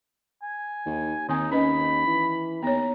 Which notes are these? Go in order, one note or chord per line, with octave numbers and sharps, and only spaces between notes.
G#5
D#2
D#2 D#3 C4 D#4 G#5
C#4 B4 D#5 B5
E3
D#2 B3 C#5 A#5